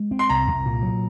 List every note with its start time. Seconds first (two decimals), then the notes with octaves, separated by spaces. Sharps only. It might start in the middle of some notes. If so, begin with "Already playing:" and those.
Already playing: G#3
0.11 C4
0.19 C6
0.29 C2 A#5
0.47 C2
0.66 A#2
0.83 F#3